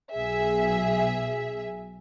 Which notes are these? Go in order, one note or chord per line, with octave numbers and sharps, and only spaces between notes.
B1 G#4 E5